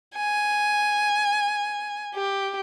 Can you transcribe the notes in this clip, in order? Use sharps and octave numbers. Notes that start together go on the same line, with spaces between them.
G#5
G4